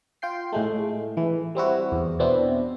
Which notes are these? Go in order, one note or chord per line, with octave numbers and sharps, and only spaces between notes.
F4 G5 C7
A2 G#3 A3
E3
G3 C4 E4 F#4
E2
B2 B3 C4 D4 E4